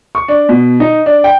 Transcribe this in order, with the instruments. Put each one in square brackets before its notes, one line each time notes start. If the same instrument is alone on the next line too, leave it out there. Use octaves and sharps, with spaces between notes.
[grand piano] C#6
D4
B2
D#4
D4
G5